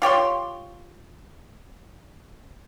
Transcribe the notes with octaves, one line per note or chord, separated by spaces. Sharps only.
F4 G4 C#5 C6